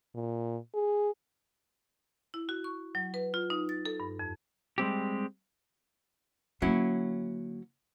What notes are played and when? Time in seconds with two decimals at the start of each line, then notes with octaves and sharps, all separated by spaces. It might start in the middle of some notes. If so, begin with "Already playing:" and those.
0.15 A#2
0.74 G#4
2.34 E4
2.49 F#4
2.64 C#6
2.95 F#3
3.14 B4
3.34 F4
3.50 D#4
3.69 A6
3.85 A4
4.00 G2
4.19 F2
4.78 G3 G#3 C4 G4
6.62 D3 F#3 A#3 C#4 E4